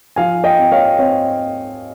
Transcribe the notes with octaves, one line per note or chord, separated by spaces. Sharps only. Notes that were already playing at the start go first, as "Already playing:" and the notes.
F3 F5 G#5
D#5 G5
C4
C#5 F5
C4 C#5